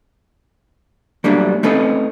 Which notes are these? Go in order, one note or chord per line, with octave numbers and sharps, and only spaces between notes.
F#3 G3 A3 A#3 D4
A3 C4 C#4 D#4 A4 B4